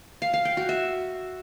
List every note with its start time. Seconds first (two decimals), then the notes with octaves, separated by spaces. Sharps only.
0.22 F5
0.34 F5
0.45 G5
0.57 F#4
0.69 E5